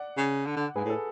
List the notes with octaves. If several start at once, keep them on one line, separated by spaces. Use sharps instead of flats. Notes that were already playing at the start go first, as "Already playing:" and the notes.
Already playing: D5 F#5
C#3
D3
D3
G#2 G#4 B4
A2
A4